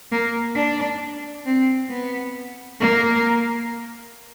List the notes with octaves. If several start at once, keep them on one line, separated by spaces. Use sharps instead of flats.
A#3
D4
C4
B3
A#3